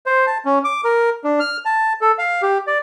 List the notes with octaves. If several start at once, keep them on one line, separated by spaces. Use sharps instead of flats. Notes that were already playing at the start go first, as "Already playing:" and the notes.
C5
A5
C#4
D6
A#4
D4
F6
A5
A4
F5
G4
D5